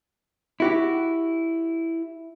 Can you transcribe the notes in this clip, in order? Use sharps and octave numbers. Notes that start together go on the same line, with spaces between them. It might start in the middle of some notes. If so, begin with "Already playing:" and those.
E4 F#4 G4